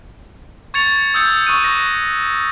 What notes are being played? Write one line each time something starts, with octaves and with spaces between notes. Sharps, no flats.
C#6 G#6 A6 C#7 F7
D#6 E6 G6 C#7
C#6 D#6 F#6 D#7
A#6